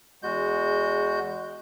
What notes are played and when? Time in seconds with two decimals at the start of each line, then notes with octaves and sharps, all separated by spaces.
0.23 E2 G#3 F#4 G6